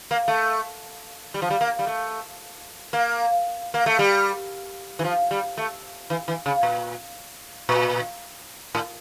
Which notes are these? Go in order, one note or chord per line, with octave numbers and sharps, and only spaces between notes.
A#3
A3
G3
F3
G3
A#3
G3
A3
A#3
A#3
A3
G3
E3
F3
G3
A3
E3
E3
C#3
A#2
A#2
A2